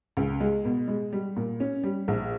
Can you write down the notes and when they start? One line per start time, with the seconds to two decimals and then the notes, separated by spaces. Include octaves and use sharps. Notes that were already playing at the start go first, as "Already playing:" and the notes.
0.17 C#2
0.40 G#3
0.65 B2
0.88 G#3
1.13 G3
1.36 A#2
1.60 C#4
1.84 G3
2.08 A#1